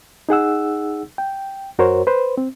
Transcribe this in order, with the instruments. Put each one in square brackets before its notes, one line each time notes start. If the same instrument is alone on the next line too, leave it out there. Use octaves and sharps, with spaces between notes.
[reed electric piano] D#4 G#4 F#5 E6
G5
F#2 F#4 A#4 C5 C#5
B4 C5
C4